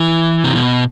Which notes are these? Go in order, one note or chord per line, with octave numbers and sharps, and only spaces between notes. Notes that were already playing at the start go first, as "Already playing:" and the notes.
Already playing: E3
C3
B2